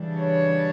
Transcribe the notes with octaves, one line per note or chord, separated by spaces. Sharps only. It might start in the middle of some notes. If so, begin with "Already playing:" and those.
Already playing: C#3 E3 G3 D4
C#5